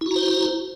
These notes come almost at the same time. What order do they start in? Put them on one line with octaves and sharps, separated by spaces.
E4 F#4 A#5 C5